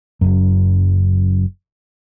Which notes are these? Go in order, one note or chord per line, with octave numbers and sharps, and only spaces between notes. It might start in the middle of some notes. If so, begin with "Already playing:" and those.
F#1 F#2